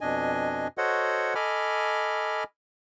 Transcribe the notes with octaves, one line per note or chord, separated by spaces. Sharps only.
F2 B2 D4 D#5 G#5
F#4 A4 C5 C#5 D#5 F#5
A4 D#5 G#5 B5 D6 F6